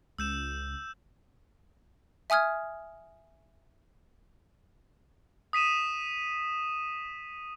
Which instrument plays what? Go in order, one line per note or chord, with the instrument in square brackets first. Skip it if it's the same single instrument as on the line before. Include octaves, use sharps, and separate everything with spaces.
[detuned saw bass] C#2 [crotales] E6 G6 E7
[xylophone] E5 G#5 D#6 F6 G#6
[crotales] D#6 B6 D#7 E7